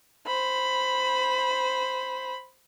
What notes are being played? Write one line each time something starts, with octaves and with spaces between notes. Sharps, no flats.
C5 B5